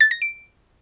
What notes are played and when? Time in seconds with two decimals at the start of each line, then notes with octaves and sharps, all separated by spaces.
0.01 A6
0.11 A#6
0.22 D7